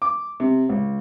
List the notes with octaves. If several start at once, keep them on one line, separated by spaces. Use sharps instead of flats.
D6
C3
C#2